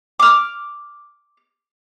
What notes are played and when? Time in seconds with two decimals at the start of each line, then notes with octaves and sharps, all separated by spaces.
0.19 D6 F6